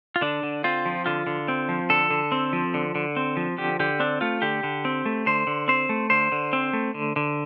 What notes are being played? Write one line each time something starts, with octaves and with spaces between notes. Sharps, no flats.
F4
D3 D4
D3
C4 F4
F3
D3 F4
D3
C4
F3
D3 A4
D3
C4
F3
D3
D3
C4
F3
D3 G4
D3 G4
C4 D4
A3 F4
D3 G4
D3
C4
A3
D3 C5
D3
C4 C5
A3
D3 C5
D3
C4
A3
D3
D3